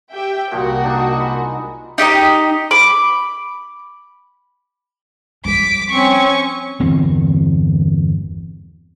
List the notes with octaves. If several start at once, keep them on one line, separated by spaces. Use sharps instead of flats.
G4 E5 G5
C2 A#2 F3 G3 F#4 A#4
D4 D#4 D#5
G#3 B5
D#4 G4 D#5 A#5
B5 D6
F3 G3 D6 B6
C4 C#4 C#6
G1 E2 C4